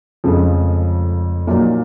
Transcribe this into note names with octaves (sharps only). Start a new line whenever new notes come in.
F1 F2 C#3 F3 G#3
A#1 A#2 F#3 A#3 D#4